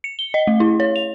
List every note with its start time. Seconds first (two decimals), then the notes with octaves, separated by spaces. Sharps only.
0.04 C#7
0.19 G7
0.34 D#5
0.47 A3
0.60 E4
0.80 C#5
0.96 F7